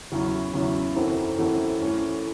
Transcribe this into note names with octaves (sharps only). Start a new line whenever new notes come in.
E2 C#3 F#3 C#4 E4
E2 C#3 F#3 C#4 E4
F#2 E3 C4 F#4 A4
F#2 E3 C4 F#4 A4
E3 A3 C#4